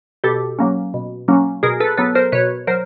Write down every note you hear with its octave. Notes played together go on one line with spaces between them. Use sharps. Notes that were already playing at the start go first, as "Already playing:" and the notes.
B2 G4 A4
F#3 A#3 C#4
B2
F#3 A#3 C#4
B2 G#4 A#4
A4 B4
F#3 B3 A4 B4
A#4 C5
B2 B4 C#5
F#3 A#4 C5